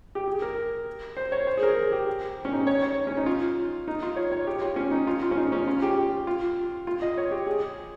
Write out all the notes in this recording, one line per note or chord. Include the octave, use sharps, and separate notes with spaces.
G4
G#4
A#4
C5
C#5
C5
G#4
A#4
G#4
G4
C#4
D#4
C#5
C#5
C#4
D#4
F4
D#4
F4
C#5
C#5
G4
F4
C#4
D#4
F4
F4
C#4
D#4
C#4
F4
G4
F4
F4
D#5
C#5
G4
G#4